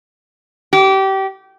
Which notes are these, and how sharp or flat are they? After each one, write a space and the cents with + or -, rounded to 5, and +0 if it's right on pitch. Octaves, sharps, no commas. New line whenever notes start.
G4 -25